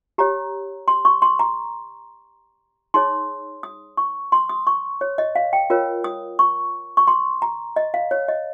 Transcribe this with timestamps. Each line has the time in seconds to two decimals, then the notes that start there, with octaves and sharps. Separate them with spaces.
0.18 G4 C#5 A#5
0.88 C6
1.05 C#6
1.22 C6
1.39 A#5
2.94 D#4 G#4 C#5 C6
3.63 D#6
3.97 C#6
4.32 C6
4.49 D#6
4.67 C#6
5.01 C#5
5.18 D#5
5.36 F5
5.53 G5
5.70 F4 A#4 C#5
6.04 D#6
6.39 C#6
6.97 C#6
7.07 C6
7.42 A#5
7.76 D#5
7.94 F5
8.11 C#5
8.28 D#5